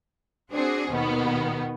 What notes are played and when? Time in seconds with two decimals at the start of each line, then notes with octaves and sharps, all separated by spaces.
0.51 C4 D4 F#4 G#4 C5
0.90 D#2 B2 D#3 B3